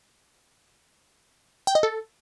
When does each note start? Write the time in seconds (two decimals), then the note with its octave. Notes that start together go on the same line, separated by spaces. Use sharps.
1.67 G5
1.75 D#5
1.83 A4